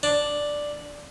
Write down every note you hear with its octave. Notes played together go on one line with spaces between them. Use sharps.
D4